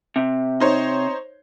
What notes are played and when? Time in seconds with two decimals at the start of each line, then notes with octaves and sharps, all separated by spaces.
0.16 C3
0.60 D#4 C5 C#5